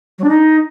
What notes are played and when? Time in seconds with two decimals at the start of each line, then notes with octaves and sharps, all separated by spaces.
0.19 F#3
0.24 D4
0.29 D#4